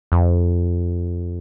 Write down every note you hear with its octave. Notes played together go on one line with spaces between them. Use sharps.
F2